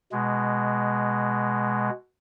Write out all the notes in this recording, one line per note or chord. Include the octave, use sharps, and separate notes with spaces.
B2 G#3